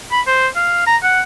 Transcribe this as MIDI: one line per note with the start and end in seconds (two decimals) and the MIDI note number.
0.12 0.21 83
0.27 0.47 72
0.55 0.82 77
0.87 0.97 82
1.03 1.21 78